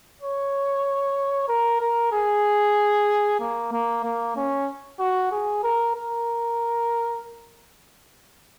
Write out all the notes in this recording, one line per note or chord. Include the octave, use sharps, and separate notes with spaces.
C#5
A#4
A#4
G#4
A#3
A#3
A#3
C#4
F#4
G#4
A#4
A#4